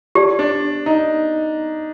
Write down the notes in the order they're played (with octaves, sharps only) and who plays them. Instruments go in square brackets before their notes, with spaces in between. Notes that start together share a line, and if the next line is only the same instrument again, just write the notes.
[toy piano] G4 D5 A5
[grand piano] D4
D#4